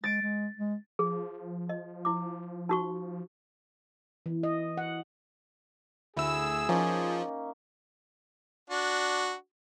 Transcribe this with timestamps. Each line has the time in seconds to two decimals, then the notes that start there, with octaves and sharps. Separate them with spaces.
0.04 G#3 A6 D7
0.21 G#3
0.57 G#3
0.99 F3 G#4
1.69 D#5
2.05 E4 D6
2.69 D#4 F#4 C#6
4.26 E3
4.43 D#5
4.77 F#5
6.17 D2 E4 G#4 E6
6.69 F3 A#3 C#4 D#4
8.70 D4 F#4